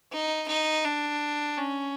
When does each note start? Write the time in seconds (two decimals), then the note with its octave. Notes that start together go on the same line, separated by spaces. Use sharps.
0.12 D#4
0.48 D#4
0.84 D4
1.58 C#4